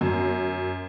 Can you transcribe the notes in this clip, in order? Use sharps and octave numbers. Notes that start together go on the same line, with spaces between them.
F#2